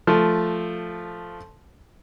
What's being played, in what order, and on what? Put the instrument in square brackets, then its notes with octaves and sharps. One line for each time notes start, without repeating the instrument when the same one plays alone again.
[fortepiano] F3 A3